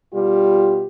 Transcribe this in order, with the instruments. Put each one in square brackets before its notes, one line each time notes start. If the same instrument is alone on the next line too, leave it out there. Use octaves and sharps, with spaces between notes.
[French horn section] B2 G3 F4 G4